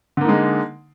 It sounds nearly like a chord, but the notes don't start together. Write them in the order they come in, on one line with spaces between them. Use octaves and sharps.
D3 A#3 D#4 G#3